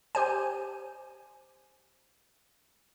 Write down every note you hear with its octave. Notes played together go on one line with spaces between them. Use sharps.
G4 C5 G#5